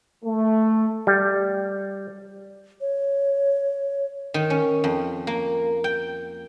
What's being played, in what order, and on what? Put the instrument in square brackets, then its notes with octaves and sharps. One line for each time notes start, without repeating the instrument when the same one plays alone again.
[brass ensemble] A3
[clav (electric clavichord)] G3
[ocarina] C#5
[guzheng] D#3
C#4
F2
A#3
G5